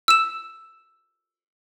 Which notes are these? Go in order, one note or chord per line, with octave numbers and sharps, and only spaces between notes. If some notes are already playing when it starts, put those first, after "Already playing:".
E6 E7